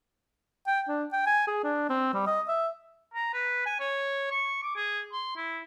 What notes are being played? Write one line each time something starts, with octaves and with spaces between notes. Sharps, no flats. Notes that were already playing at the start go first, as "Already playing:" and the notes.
G5
D4
G5
G#5
G#4
D4
C4
G3
D#5
E5
A#5
B4
G#5
C#5
C#6
D6
G#4
C6
E4